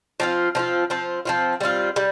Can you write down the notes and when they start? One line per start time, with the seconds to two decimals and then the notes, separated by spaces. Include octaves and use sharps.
0.20 F3 C4 F4
0.55 F3 C4 F4
0.90 F3 C4 F4
1.25 F3 C4 F4
1.60 G3 C4 F4
1.96 G3